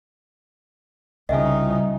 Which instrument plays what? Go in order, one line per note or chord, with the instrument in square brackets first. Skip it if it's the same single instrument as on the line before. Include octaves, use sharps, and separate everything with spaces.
[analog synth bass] C2 [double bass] C#3 D#4 [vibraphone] G3 F4 [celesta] D#5 E5 G#5